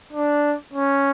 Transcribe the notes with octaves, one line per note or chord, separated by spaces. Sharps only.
D4
C#4